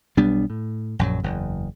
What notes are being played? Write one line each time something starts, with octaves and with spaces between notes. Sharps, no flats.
B1 G3 B3 D4
A2
A#1 F#2 E3 F#3
F#1 E2